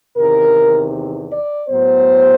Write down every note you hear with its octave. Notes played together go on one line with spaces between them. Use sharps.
E2 C3 D#3 A#4
D5
A2 F#3 B3 C5